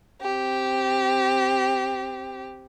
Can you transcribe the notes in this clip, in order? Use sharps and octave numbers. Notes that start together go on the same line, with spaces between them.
C4 G4